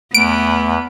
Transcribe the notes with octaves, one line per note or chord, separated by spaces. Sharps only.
E2 A3 B3 D7